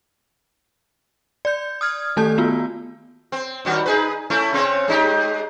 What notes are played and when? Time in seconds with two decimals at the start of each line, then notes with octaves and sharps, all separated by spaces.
1.45 D5 G6
1.81 D#6 F6 G#6
2.17 D#3 A3 G4 A4 A5 G6
2.38 B3 F4 F#4
3.32 C4
3.65 D#2 G3 F#4
3.86 D#4 G#4 B4
4.30 A3 C#4 E4
4.53 C#3 C4 C#5
4.88 G#3 D#4 G4